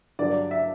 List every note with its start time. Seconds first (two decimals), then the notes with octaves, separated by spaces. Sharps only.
0.19 G2 D3 F#3 D5
0.51 E5